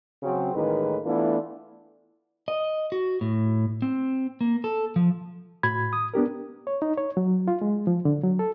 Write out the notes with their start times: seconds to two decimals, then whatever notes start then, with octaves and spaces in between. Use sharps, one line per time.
0.23 C#3 F#3 C4
0.55 A1 A2 D#3 G#3 A#3 B4
1.05 E3 A3 B3 D4 E4 F4
2.48 D#5
2.92 F#4
3.21 A2
3.82 C4
4.41 A#3
4.64 A4
4.96 F3
5.63 A2 F#4 B5 G#6
5.93 D#6
6.14 B3 D4 G4 A#4
6.67 C#5
6.82 D#4
6.97 C#5
7.17 F#3
7.48 F4
7.62 G#3
7.87 F3
8.05 D3
8.24 F#3
8.39 A4